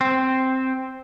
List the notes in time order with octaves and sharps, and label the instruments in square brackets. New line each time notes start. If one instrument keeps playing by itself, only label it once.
[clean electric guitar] C4